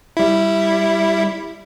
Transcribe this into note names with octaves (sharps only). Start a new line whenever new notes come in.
G3 E4